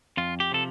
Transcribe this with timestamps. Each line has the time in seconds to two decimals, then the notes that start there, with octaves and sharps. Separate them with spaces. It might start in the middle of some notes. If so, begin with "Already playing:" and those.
0.17 F2 F4
0.40 G4
0.52 C3 F3 A4